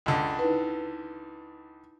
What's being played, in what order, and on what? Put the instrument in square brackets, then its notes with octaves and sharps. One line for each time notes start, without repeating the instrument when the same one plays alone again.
[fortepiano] C#2 D3
[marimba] D#4 E4 B4